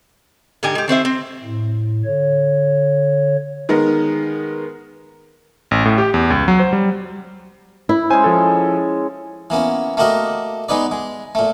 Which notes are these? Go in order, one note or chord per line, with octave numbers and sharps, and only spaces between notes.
G#2 D3 G4 G#5
G#3 G4
D#3 C4 C5 E5
C4
A2
D3 C#5
D#3 G#3 B3 A#4
A1
A2
G4
E2
C#2
F#3
C5
G3
E4
G#3 C#4 C5 G#5
F3 A4
E3 A#3 B3 C#4
A3 A#3 F#4 G4 A#4 D#5
G#3 B3 D#4 B4 D5
G#3
A#2 A3